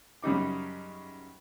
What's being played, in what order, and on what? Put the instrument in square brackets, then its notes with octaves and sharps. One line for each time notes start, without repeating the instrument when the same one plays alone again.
[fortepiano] F#2 C#3 G3 D#4 D6